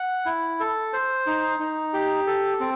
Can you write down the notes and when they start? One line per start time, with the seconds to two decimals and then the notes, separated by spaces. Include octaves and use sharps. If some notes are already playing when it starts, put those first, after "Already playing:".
Already playing: F#5
0.26 E4
0.60 A4
0.93 C5
1.27 D#4
1.60 D#4
1.93 G4
2.27 A4
2.60 C4